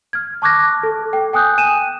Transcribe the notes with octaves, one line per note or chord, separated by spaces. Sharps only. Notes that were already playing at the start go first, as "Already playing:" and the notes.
F6 G#6
A5 C#6 D6 F#6 G#6 A#6
A4
G5
G5 G#5 D#6 F#6 G6
G#5 D#7 E7